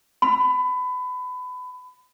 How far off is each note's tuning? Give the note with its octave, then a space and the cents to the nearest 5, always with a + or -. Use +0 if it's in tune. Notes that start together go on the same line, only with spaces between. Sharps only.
B5 +25